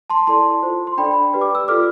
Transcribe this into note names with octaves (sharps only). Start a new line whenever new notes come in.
A5 C6
E4 A4 D5 A5 C6
F4 A4 C5
C6
D4 A4 D5 G5 B5
G4 B4 D5
D6
E6
F4 A4 D5 D6 F6